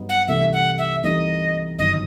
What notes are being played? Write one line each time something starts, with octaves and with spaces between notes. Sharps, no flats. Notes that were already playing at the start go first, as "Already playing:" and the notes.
Already playing: G2 F#3 B3 D#4
F#5
C2 C3 E3 A3 D#4 E5
F#5
E5
C2 C3 E3 A3 D#4 D#5
G1 F#2 D#3 D#5